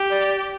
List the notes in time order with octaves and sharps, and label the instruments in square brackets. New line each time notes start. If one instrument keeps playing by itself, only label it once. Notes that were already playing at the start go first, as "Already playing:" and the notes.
Already playing: [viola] G4
[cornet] D5